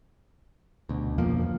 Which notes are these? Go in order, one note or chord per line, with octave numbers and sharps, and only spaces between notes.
D2 B2
E1 F2 F3 A#3